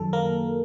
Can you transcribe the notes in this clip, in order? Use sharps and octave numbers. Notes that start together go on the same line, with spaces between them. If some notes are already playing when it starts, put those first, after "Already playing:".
Already playing: F#2 D#3 F#3 A4
A#3 A#4